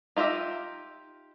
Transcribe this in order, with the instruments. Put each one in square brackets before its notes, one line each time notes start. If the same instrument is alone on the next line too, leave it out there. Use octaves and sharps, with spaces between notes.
[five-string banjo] D#4 F4 G4 D#5 E5